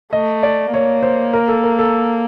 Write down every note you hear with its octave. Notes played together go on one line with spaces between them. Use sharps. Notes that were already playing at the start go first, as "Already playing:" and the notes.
A3 D#5
D5
A#3 C#5
C5
A#4
A4
A#4
A4